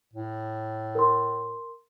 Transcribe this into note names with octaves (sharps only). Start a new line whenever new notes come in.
A2
A#4 C6